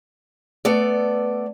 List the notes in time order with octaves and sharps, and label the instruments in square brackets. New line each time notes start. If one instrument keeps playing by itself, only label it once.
[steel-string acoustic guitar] A3 B3 A4 D5